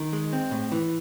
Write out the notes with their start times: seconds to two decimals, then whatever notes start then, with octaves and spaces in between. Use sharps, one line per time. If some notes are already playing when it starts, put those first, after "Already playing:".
Already playing: D#3
0.13 G#3
0.33 C4
0.51 A2
0.72 E3